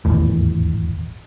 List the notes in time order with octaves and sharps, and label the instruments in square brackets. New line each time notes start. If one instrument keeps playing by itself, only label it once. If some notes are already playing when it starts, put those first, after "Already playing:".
[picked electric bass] D#1 G#1 E2 A2